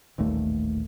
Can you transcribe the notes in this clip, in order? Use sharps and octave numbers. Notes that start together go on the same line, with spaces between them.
D#1 A1 D#2 A3